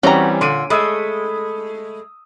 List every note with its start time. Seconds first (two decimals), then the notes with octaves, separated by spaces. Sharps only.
0.03 E3 G3 C4 C#4 F#4 G4 A#5
0.41 A#2 D3 C6 D7 D#7
0.70 G#3 A3 B5 D#6 E6